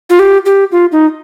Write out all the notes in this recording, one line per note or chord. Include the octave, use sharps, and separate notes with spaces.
F4
G4
G4
F4
D#4